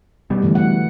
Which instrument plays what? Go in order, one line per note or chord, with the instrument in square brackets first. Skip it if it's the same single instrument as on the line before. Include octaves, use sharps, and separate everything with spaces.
[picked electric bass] B2 G3
[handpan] D3 E3 A3
F#5